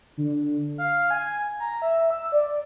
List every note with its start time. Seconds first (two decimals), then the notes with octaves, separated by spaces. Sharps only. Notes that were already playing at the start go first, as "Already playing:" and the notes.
0.17 D3
0.78 F5
1.11 G#5
1.60 A#5
1.82 E5
2.10 E6
2.32 D5